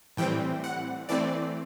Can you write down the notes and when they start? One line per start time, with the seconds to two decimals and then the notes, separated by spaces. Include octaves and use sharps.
0.17 A2 E3 G3 C4 G5
0.64 F#5
1.09 E3 A3 C4 D5